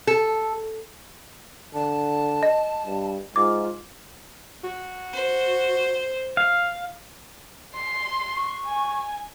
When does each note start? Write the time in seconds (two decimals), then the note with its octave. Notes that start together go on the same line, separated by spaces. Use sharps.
0.07 A4
1.74 D3 A5
2.43 D#5
2.86 G2
3.36 G#2 F4 D6
4.64 F#4
5.13 C5
6.37 F5
7.74 C6
8.36 C#6
8.66 G#5